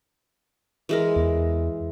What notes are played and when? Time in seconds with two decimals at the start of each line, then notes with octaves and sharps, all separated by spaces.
0.89 E3 G#3 A#4
1.16 E2